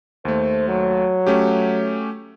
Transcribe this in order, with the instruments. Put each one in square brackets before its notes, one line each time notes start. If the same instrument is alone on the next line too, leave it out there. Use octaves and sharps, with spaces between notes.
[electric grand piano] D#2 A3 [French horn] C5
[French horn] F#3
[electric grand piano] A3 C#4 G4